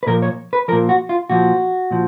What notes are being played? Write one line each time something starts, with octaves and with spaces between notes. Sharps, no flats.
B4
A#2 F3 A#4
C#5
B4
A#2 F3 A#4
F#4
F4
A#2 F3 F#4
A#2 F3